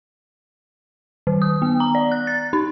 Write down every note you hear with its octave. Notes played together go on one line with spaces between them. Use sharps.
D#3
D#6
B3
A#5
D5
F#6
A6
D#4